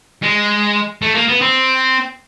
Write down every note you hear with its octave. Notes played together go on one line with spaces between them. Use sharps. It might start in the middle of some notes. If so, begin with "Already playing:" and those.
G#3
A3
A#3
B3
C4